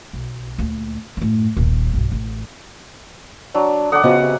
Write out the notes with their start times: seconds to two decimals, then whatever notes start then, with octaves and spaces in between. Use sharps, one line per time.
0.13 B1
0.59 D2 A#2
1.17 F#2 A2
1.57 D#1 A#1
1.94 B1 G2
2.12 A1
3.54 F#3 D4
3.92 D3 F#5 D6 D#6
4.04 C#3 F3 B3 C#4 F#4 D#5
4.22 C3